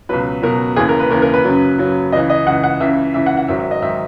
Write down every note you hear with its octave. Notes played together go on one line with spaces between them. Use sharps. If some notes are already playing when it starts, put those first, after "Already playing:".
C#2 B2 F#3 B4
C#2 B2 F#3 A#4
D#2 C#3 E3 G#4
A#4
B4
D#2 C#3 E3 A#4
A#4
B4
F#2 C#3 F#3
F#2 C#3 F#3
C#2 C#3 E3 D#5
D#5
C#2 C#3 E3 F#5
F#5
C#2 C#3 E3 E5
C#2 C#3 E3 E5
F#5
F#5
G#2 D#3 F#3 E5
E5
D#5
G#2 D#3 F#3 E5